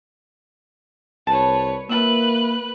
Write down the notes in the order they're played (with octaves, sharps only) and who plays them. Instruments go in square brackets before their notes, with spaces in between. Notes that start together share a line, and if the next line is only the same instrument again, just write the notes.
[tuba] C2 [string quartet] B4 C#5 [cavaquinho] A5
[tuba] A#3 [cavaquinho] F4 E5 [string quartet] B4 F#6